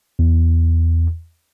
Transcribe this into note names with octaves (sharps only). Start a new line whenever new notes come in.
E2